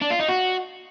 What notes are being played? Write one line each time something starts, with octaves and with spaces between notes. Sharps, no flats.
D4
F4
D#4
F#4